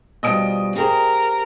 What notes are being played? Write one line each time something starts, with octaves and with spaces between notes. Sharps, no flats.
B2 F3 G3 D#5 D#6 D7
G4 G#4 A#4 C5